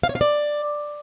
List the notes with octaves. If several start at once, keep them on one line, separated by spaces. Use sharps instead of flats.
F5
C#5
F5
D5